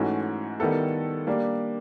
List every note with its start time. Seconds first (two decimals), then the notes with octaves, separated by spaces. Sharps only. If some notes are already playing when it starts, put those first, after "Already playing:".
Already playing: G#2 E3 A3 C#4 F#4
0.60 D#3 G3 B3 E4 A4
1.27 G3 A#3 D4